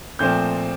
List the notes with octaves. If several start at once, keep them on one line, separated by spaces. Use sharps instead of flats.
A#2 F3 A3 C4 G6